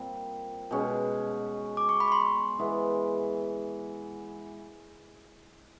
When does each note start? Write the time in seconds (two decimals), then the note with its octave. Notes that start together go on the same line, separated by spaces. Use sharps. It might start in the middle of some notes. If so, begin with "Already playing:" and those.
Already playing: A#2 G3 C4
0.71 B2 G#3 C#4
1.77 D6
1.89 C#6
2.00 B5
2.08 C#6
2.12 C6
2.59 E3 G#3 B3